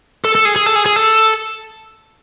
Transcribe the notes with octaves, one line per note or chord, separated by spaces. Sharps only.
A4
A4
G#4
G#4
A4
G#4
G#4
A4